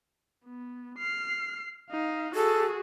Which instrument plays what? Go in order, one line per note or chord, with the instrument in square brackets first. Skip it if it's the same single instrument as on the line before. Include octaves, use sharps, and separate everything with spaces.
[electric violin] B3
F6 C7
D#4 F5
[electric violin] F#4 G#4 [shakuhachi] A4